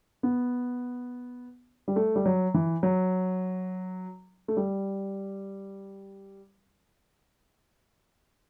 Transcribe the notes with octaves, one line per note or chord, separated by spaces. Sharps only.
B3
G3
A3
G3
F#3
E3
F#3
A3
G3